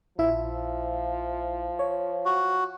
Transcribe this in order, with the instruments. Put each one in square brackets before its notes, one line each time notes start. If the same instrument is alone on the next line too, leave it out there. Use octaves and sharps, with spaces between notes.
[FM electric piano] A#1 E4 E5 [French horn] F3
[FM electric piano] C#5
[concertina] F#4